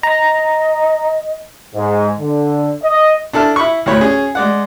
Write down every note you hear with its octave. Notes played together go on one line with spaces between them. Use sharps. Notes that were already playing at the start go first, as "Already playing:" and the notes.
D#5 A#5
G#2
D3
D#5
D4 E4 A4 A5 F6
E4 B5 C#6
D2 A2 C#5 B5
C#4 G#4
G#3 D5 F#5